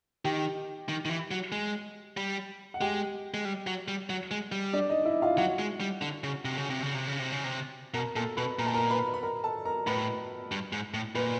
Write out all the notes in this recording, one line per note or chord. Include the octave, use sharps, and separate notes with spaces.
D#3 G4 G5
D#3
D#3
E3
F#3
G#3
G3
F#5
G#3 G4 G5
G#3
G3
F#3
G3
F#3
G#3
G3
D4 D5
D#4 D#5
E4 E5
F4 F5
F#3 F#4 F#5
G#3
G3
D3
C#3
C3
C#3
C3
C#3
C3
C#3
C3
C#3
C3
B2 A#4 A#5
A#2 A4 A5
B2 B4 B5
A#2 A#5
A5
A#4 A#5
B4 B5
B5
A#4 A#5
A4 A5
A#4 A#5
A2 B4 B5
G2
G#2
A2
A#2 B4 B5